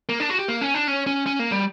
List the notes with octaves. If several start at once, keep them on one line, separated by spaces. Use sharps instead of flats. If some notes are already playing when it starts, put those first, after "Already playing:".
A#3
D4
F#4
G4
A#3
C#4
D4
C#4
C#4
C#4
A#3
G3